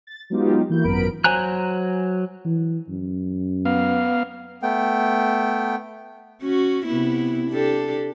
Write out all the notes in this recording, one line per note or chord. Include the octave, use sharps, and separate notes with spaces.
A6
F#3 G#3 B3 D#4 F4 G4
E3 A#3 E4 F#4 G6
G#1 F#2 B3 A#4 B5 D7
F#3 C5 G#5 A#5 F#6
E3
F#2
B3 F5
A3 B3 G5
C#4 F#4
C3 B3 E4
D4 G4 A4